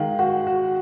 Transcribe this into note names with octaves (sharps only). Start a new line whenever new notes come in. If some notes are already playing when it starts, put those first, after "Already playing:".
Already playing: D#3 G#3 F5
F#4 F#5
F#4